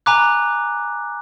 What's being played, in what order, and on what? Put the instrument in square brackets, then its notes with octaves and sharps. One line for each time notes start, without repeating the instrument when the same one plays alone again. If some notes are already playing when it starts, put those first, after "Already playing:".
[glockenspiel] G#5 A#5 B5 D6 F#6